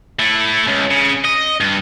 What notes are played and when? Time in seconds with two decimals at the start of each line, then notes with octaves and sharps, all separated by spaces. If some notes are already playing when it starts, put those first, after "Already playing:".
0.19 A3 E4
0.67 C#2
0.91 C#3
1.25 D#5
1.60 G2